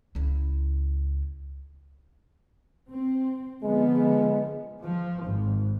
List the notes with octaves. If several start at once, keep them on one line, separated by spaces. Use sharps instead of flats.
C#2 E4
C4
D3 F3 G#3 B3
G#3
F3
G#1